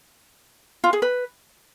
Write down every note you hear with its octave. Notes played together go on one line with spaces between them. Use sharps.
F4
G#4
B4